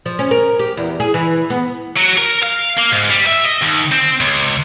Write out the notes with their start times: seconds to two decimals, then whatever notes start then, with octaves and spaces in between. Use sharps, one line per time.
0.06 F3
0.19 C#4
0.31 A#4
0.59 G4
0.77 E2
1.00 G#4
1.14 E3
1.50 B3
1.96 F#3
2.18 A#4
2.43 F5
2.78 A#3
2.93 G#2
3.10 G3
3.27 E5
3.45 D#5
3.62 D#2
3.92 C4
4.21 C#2